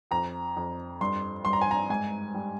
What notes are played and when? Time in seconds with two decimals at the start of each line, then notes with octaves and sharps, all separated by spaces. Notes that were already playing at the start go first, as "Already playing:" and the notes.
0.11 F2 A#5
0.56 F2
1.01 G2 C6
1.45 G2 C6
1.53 A#5
1.61 G#5
1.71 A#5
1.90 G#2 G#5
2.34 G3